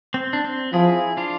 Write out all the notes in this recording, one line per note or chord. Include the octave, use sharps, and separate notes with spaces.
C4
D4
C4
F3 E4 G#4
D4 F4